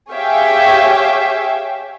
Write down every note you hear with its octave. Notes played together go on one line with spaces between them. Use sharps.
G4 G#4 C#5 E5 F5 G5